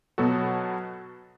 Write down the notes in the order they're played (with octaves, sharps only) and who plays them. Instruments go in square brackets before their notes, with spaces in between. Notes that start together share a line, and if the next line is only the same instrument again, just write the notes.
[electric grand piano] B2 F#3 B3 F#4 A4